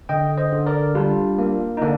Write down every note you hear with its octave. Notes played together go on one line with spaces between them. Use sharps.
D3 D#5 G5
C5 D#5
D3
A#4 D5
G3 D4 F4
A#3
D#4
D3 A#3 D4